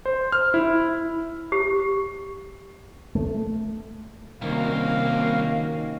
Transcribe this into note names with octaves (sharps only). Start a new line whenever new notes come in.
C5
F6
E4
G4
A3
C2 D#3 A#3 C#4 F#4 F5